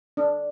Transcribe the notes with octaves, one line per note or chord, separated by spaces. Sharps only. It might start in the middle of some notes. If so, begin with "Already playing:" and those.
D4